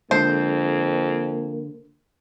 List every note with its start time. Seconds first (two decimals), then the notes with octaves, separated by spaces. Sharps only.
0.11 F2 D3 G#3 A#3 C5 A5